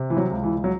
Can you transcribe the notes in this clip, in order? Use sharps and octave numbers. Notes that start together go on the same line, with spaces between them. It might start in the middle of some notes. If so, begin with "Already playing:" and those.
Already playing: C3
E3
F#3
C#2
E3
F#3